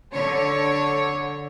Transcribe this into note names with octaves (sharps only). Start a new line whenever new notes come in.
D3 C#5